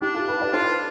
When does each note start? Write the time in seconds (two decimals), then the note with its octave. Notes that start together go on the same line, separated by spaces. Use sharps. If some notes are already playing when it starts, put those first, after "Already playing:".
0.01 D4 E4 G4
0.14 F4 A4
0.28 G4 B4
0.41 B4 D5
0.53 F4 A4 C5